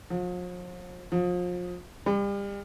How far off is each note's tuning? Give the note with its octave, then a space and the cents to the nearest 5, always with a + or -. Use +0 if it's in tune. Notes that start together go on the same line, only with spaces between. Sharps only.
F3 +45
F3 +35
G3 +35